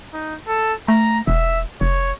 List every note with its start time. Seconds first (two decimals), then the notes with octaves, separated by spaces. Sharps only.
0.13 D#4
0.48 A4
0.88 A3 A#5
1.27 E1 E5
1.81 F1 C#5